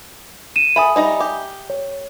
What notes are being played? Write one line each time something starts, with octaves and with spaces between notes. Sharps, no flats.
D#7 E7
A4 E5 G#5 B5 D#6
G3 D#4 A#5
G4
C#5